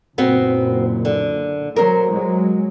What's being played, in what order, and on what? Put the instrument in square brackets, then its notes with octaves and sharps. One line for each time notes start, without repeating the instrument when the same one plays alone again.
[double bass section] F#1 A#2 [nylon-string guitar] B3 C4 F#4
[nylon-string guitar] D3
[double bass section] F#3 [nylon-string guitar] A#4 C5
[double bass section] F#3 G#3